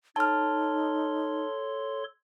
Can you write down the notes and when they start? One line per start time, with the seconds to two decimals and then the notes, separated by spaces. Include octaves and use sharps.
0.16 D#4 A4 C#5 A5 C6 F6